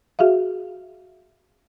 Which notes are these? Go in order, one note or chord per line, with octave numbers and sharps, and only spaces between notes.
F#4 G#4 E5 F5